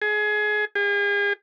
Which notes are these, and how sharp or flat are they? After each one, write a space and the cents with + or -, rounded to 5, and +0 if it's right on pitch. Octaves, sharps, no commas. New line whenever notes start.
G#4 +25
G#4 -40